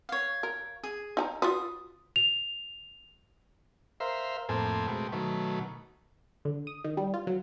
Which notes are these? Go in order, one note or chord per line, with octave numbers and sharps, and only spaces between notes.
C#5 F5
A#4
G#4
D#4 G#5 A#5
F4 F#4 B4 D#6
F7
A#4 C5 E5 F5
F2 A2 A#3 C4 A4 G#5
B2 G#3 A3 C4
B2 D#3 F#3 A3
D3
D#6
D#3
G3
F4
F#3